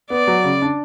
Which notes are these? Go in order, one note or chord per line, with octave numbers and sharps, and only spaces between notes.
B3 D5
F#3
C#3
D4